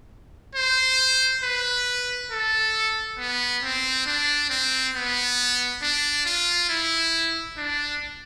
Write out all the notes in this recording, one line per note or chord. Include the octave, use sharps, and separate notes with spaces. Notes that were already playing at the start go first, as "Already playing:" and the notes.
C5
B4
A4
B3
C4
D4
C4
B3
D4
F4
E4
D4